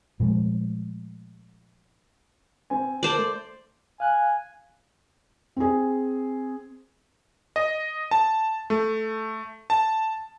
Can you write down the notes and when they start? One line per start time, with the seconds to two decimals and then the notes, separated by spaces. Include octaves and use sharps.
0.20 A#2 F3 G#3 A3
2.70 C4 G#5
3.03 A#4 C5 D5 A5
3.18 A3
4.00 F5 G#5 F#6
5.56 C4 G#4
7.56 D#5
8.11 A5
8.70 A3
9.70 A5